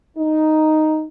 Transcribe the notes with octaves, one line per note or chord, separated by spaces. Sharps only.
D#4